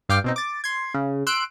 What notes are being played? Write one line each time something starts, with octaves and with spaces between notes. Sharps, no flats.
G2 F5 G5 D6 C7
B2 C4 D#4
D6 A6
C6 G#6
C#3
C6 E6 F#6 D7